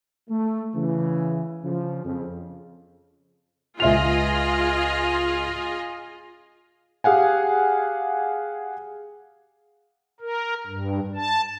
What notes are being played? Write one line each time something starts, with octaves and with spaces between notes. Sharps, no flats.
A3
C#3 E3
C#3 F3
F2 C#3
C#2 F4 G#4 D#5 E5 F7
G4 G#4 F5 F#5 G#5
A#4
G2
A5